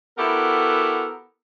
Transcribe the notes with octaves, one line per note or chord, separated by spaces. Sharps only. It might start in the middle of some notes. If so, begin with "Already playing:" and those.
B3 E4 F#4 G4 A4 A#4